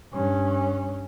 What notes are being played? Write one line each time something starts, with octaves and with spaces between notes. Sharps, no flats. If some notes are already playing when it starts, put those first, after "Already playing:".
G2 C#4